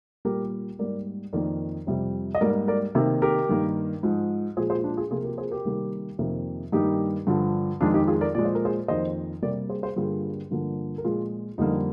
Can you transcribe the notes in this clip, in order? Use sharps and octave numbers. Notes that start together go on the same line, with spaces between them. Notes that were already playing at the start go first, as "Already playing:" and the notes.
A#2 G3 A#3 G4 A#4
G#2 G3 A#3 A#4 D5
F2 D#3 A#3 A#4 D5
F2 C3 G3
D#5
G#2 G3 A#3 A#4 D5
A#4 D5
C3 D#3 A#3
G4 A#4
G2 D#3 A#3
G#2 F3 G#3
A#2 F3 G#3 G#4 C5
G#4 C5
D4 F4
F4 G#4
C3 F3 A#3 F4 G#4
G4 A#4
G#4 C5
G4 A#4
C3 D#3 G3 A#3
F2 C3 D#3 A#3
G2 D#3 G3 A#3 D#4 G4
G2 D3 F3
F2 D#3 G#3 D4 F4
D#4 G4
F4 G#4
A#4 D5
A#2 F3 G#3 D5
C5
A#4
G#4 C5
F2 D#3 A#3 C5 D#5
C3 G3 A#3 A#4 D5
G#4 C5
G#4 C5
G2 D3 G3 A#3 F4 G#4
G2 D3 F3 A#3
A#4
A#2 F3 G#3 F4 G#4
F2 D3 G3 A#3 D#4